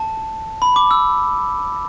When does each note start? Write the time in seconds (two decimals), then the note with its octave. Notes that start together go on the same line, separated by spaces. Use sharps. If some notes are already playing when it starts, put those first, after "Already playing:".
Already playing: A5
0.62 B5
0.76 D6
0.91 E6